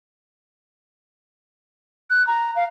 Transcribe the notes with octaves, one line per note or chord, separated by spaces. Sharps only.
F#6
A#5
F5